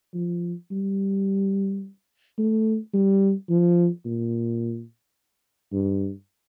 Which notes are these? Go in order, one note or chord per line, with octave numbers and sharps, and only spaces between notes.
F3
G3
A3
G3
F3
A#2
G2